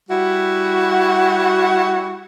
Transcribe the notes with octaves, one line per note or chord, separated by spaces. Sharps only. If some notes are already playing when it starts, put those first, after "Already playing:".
G3 E4 F#4